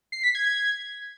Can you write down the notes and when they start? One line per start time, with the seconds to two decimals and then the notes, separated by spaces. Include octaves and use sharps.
0.12 C7
0.24 B6
0.35 G#6
0.46 G#6